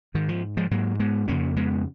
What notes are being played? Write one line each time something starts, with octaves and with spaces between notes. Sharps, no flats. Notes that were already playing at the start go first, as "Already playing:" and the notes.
G#2 D#3
F3
F3 G#3
G#2 F#3 A#3
G#3 B3
F2 C#3 A#3 C#4
G#3 B3